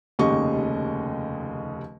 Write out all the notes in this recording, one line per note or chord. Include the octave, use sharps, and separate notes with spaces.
F1 D#2 C#3 G4 D#5 C#6